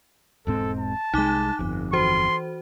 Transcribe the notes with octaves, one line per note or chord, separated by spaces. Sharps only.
E1 G#2 C4 A4
A5
C2 G#3 D#4 D6 F#6
G1 F2
E3 F#4 C5 C6